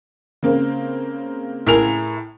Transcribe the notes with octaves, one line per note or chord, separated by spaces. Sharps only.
C#3 A#3 C4
A2 G#4 A#4 E5 F7